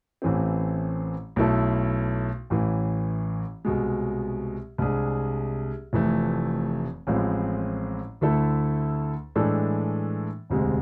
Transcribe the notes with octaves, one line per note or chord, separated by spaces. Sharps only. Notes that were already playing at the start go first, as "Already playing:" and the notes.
A1 A2 E3 A3 C4
B1 B2 A3 E4 A4
A1 A2 E3
C2 B2 G#3
C2 C3 G#3 D4 G#4
F1 F2 E3 A3
A1 A2 F3 G#3 C4
D2 D3 A3 E4 A4
A2 E3 G#3 D4 A4
E1 D2 C3 G#3